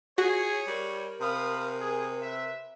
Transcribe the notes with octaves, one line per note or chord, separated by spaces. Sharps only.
F4 F#4 G#4 C#5
G3 A#4
C3 F5 B5 D#6
G#4
B4 E5